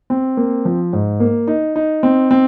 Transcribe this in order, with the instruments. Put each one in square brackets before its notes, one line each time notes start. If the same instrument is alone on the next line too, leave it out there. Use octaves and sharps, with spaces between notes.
[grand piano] C4
A#3
F3
G#2
A#3
D#4
D#4
C4
C4